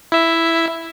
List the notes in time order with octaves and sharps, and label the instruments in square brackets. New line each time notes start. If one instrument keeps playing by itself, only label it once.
[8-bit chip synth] E4 E5